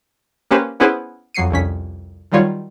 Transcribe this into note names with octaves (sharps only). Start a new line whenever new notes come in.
A#3 C#4 G4 B4 C5
B3 C#4 E4 G#4 B4 C5
F2 F#3 C7 C#7 D#7
C2 F2 C#4 B6
D#3 F#3 G3 F4 C#5